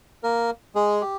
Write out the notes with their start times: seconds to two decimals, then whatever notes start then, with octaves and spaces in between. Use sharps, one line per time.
0.23 A#3 A#4
0.75 G#3 G#4
1.01 G4